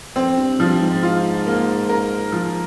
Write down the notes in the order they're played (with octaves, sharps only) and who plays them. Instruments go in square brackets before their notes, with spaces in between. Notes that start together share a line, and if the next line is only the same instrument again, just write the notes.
[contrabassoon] F2 [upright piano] C4
[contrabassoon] G2
[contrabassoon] G2 [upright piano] F3
[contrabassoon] G#2
[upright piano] F4
A#3
A#4
F3